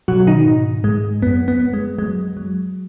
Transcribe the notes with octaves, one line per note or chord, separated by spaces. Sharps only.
B2 F#3 F#4
D#3 D#4
G#2
G#2 G#3
F#2 B3
B3
F#2
G#3
F#3 G#3
F#3